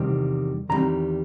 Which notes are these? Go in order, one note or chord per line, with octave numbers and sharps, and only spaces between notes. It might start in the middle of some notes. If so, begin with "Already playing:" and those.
Already playing: E2 C3 D#3 G3 C4
E2 C3 D#3 G3 C4 A#5